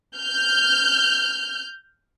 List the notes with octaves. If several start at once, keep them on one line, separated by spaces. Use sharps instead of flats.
F6 G6